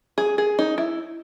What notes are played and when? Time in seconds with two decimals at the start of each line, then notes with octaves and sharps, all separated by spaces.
0.18 G#4
0.38 G#4
0.59 D#4
0.78 E4